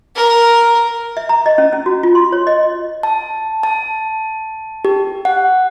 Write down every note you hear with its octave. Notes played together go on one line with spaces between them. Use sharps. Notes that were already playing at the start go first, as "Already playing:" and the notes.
A#4
E5
A#5
D#5
C#4
C#4
F#4
F4
C6
C#5
D#5
A5
A5
G4
F#5